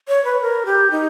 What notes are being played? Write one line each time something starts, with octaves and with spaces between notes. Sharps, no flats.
C#5
B4
A#4
G4
D#4